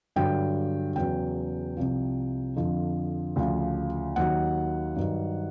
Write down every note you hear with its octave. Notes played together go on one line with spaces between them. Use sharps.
G2 D3 F#3 G5
E2 C#3 F#3 G5
C2 C3 F3
F2 D3 F3
D2 C#3 F3
D#2 D#3 F#3 F#5
G2 D#3 F#3